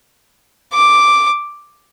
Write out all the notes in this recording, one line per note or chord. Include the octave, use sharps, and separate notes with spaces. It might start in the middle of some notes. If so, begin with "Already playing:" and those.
D6